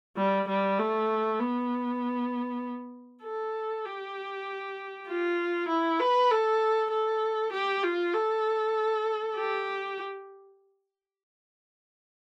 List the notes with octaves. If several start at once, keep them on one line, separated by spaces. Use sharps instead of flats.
G3
G3
A3
B3
A4
G4
F4
E4
B4
A4
A4
G4
F4
A4
G4